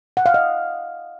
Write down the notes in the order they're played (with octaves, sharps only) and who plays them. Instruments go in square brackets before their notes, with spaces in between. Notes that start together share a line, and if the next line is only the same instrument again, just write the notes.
[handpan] F#5
F5
D#5